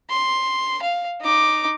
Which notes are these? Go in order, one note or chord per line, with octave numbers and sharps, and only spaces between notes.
C6
F5
D#4 D6